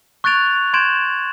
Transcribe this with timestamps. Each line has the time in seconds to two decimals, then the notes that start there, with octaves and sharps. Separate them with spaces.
0.24 C#6 F#6 G#6 A6 D7 F7
0.73 C6 G6 G#6 D7 E7 F#7